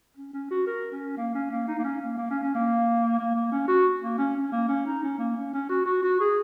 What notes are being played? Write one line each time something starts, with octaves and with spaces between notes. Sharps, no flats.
C#4
C#4
F#4
A#4
C#4
A#3
C#4
A#3
D#4
A#3
C#4
A#3
A#3
C#4
C#4
A#3
A#3
A#3
C#4
F#4
A#3
C#4
C#4
A#3
C#4
D#4
C#4
A#3
C#4
C#4
F#4
F#4
F#4
G#4